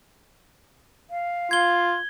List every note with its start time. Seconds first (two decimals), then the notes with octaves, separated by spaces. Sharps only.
1.10 F5
1.51 F4 G#6 G7